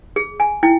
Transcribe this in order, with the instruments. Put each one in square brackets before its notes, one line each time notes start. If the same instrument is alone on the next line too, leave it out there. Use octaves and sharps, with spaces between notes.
[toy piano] G#4
G#5
E4 G5